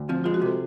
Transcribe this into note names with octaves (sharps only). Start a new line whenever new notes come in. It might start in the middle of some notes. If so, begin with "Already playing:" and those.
Already playing: D2
F3 C4
G#3 F4
F#4
C3 A4